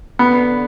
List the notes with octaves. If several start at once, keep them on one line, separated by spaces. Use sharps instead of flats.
D3 B3